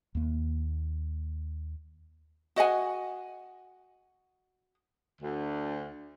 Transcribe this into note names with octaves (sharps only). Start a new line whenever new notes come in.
D#2 A#3
F#4 D#5 F#5 G#5
D2